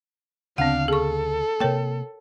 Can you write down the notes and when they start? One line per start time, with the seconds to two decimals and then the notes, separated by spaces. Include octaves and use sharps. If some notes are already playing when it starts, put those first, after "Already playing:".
0.58 D2 C#3 B3 C4 D4 F5 F#5
0.88 G#4 A4 C#6
1.60 C3 A#3 A#4 C#5 G5